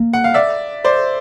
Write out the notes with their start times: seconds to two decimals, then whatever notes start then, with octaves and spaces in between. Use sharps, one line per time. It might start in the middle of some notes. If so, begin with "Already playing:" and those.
Already playing: A#3
0.13 F#5
0.24 F5
0.34 D5 E5
0.84 C5 D5